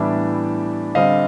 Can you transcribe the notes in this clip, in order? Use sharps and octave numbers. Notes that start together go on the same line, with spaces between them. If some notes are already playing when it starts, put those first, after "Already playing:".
Already playing: A2 E3 G3 B3 D4 D5 E5
D3 G3 C4 D#5 F5